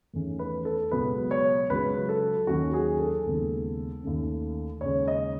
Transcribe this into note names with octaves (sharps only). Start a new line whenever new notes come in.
E2 D#3 A3 C#4
B4
A4
C#2 B2 F#3 B3 B4
C#5
C#2 C#3 F#3 B4
A4
D#2 D#3 F#3 C#4 F#4
G#4
A4
D#2 C#3 G#3 B3
D#2 D#3 A3 C#4
D#2 C#3 G#3 C#4 C#5
D#5